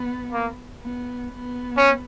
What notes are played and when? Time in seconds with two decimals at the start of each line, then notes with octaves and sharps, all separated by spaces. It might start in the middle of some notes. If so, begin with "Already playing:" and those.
Already playing: B3
0.32 A#3
0.81 B3
1.29 B3
1.77 C#4